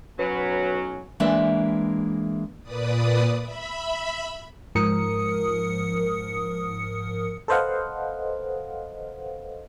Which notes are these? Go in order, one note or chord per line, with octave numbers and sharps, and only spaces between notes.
B1 F#3 C#4 B4
E3 G#3 A#3 D4 B4 E5
A#2 B4 D5 D#6
E5 B5
G#2 F3 A#4 D#6 C#7
A4 B4 C5 D#5 F5 F#5